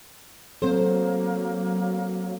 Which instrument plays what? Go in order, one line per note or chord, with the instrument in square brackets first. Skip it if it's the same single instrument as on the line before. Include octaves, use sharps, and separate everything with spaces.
[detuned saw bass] F#3 [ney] A#3 [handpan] C4 A4 [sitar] C5